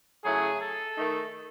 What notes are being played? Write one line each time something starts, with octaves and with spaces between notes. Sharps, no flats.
C#3 F#3 A3 E4 G#4
A4
D#3 A3 D#4